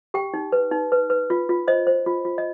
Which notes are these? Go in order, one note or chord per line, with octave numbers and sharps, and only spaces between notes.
G4 G5
D#4
B4
D#4
B4
B4
F4
F4
C5 D#5
C5
F4
F4
D#5